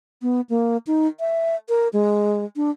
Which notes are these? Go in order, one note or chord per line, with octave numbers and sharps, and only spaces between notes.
B3
A#3
D#4
E5
A#4
G#3
D4